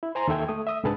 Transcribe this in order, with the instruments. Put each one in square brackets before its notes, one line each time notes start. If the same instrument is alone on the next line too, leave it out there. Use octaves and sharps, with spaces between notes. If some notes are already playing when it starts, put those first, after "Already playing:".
[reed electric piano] E4
C5 G#5 A#5 C6
D#2 D#3 A4 E5 G5 G#6
A3 D#6
E5 D#6 E6
C2 G#2 D3 G#4 B4 A5